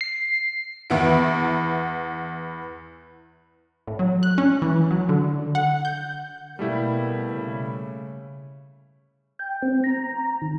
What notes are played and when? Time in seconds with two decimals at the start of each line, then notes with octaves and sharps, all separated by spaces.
0.01 C7
0.90 E2 B3 E4 D7
3.87 A2
3.99 F#3
4.23 F#6
4.38 C#4
4.62 E3
4.91 F#3
5.09 D3
5.55 F#5
5.85 G6
6.59 B2 G3 A3 A#3 E4
7.34 C#3
9.39 G5
9.62 C4
9.84 A#5
10.42 D#3